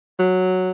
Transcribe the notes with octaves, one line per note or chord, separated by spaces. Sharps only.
F#3